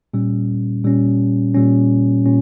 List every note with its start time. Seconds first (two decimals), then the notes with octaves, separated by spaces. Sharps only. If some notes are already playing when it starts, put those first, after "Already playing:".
0.14 A#2 G3 C#4
0.84 A#2 G3 C#4
1.55 A#2 G3 C#4
2.26 A#2 C#4